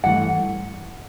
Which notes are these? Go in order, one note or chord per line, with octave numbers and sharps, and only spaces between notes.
G2 E3 A3 F#5